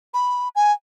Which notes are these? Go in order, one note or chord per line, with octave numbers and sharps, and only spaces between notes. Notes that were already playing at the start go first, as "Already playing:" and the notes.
B5
G#5